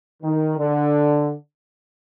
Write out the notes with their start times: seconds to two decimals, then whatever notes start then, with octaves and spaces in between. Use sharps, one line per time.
0.23 D#3
0.57 D3